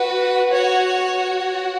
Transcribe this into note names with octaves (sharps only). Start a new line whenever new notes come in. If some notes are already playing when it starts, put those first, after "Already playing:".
Already playing: F#4 B4
F#4 C#5
F#4